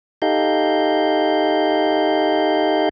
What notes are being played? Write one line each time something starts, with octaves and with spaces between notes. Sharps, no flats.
D#4 G4 A4 D#5 F5 G6